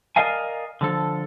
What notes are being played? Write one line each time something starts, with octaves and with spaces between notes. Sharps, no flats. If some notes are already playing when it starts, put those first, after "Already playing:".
A#4 D5 D#5 F5 G#5
D3 F3 A4